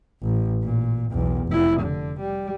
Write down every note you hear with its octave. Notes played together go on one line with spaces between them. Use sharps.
A1
A#2
B1 E2
F1 E4
D3
G3